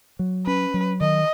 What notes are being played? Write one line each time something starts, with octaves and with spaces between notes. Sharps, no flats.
F#3
C#4 B4
F#3
D#3 D#5